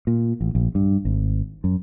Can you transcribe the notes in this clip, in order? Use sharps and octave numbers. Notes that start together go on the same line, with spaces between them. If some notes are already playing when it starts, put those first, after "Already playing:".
A#2
A1
A#1
G2
G#1
F#2